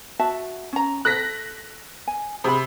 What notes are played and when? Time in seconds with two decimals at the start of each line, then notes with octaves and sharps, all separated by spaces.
0.19 F#4 E5 A5
0.73 C#4 A#5
1.05 A4 F#6 A#6 B6
2.07 G#5
2.44 C3 G#4 B5